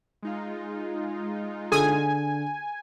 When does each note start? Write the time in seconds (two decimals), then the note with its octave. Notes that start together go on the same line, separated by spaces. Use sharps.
0.23 G#3 D#4 F4
1.72 D3 G#4 A4 G#5 D#6